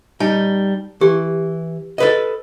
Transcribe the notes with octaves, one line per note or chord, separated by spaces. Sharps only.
G3 D#4 A5
E3 G4
A4 B4 D#5